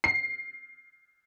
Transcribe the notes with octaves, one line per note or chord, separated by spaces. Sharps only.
C7